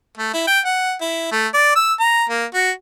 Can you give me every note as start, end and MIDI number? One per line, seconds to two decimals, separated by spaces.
0.17 0.32 57
0.34 0.45 64
0.47 0.60 79
0.65 0.94 78
1.01 1.29 64
1.32 1.48 57
1.54 1.75 74
1.76 1.93 88
2.00 2.24 82
2.29 2.45 58
2.54 2.71 66